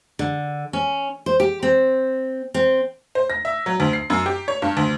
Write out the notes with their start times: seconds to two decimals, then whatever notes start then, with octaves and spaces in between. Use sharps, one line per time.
0.19 D3
0.73 C#4
1.26 C5
1.40 G4
1.63 C4
2.54 C4
3.15 C5
3.30 A#6
3.45 E5
3.66 F#3
3.80 D2
3.93 C7
4.10 F#2
4.26 G4
4.48 C#5
4.62 G2
4.77 D2